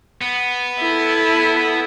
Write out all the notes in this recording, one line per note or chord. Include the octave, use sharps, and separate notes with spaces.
B3
E4 A4